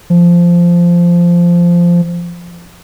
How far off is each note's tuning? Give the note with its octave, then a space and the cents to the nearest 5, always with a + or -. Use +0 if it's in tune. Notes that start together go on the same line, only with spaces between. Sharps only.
F3 -10